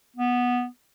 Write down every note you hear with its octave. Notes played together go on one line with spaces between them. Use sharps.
B3